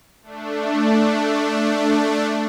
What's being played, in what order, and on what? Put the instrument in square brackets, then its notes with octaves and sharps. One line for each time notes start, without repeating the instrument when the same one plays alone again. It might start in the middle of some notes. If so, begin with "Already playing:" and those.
[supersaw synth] A3 D4